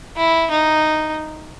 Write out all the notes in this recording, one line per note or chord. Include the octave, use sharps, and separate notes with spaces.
E4
D#4